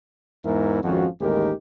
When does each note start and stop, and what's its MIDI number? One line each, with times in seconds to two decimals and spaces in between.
0.45 0.83 40
0.45 0.83 44
0.45 0.83 52
0.45 0.83 59
0.45 0.83 64
0.45 0.83 70
0.83 1.07 32
0.83 1.07 41
0.83 1.07 53
0.83 1.07 61
0.83 1.07 66
1.21 1.52 33
1.21 1.52 39
1.21 1.52 56
1.21 1.52 63
1.21 1.52 67
1.21 1.52 70